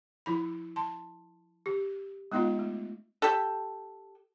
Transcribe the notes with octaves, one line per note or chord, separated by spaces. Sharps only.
F3 E4 B5
A5 C6
G4
G#3 B3 D#4 F4 D#5 F5
A3
G4 A4